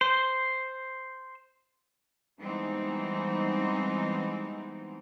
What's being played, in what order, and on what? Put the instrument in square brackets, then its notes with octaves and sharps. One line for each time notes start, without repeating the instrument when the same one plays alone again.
[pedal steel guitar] C5
[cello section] E3 G3 G#3 B3 C4 D#4